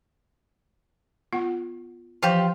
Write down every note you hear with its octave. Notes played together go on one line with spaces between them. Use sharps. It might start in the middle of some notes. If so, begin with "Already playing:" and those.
B3 F4 F#5
E3 F3 F4 G4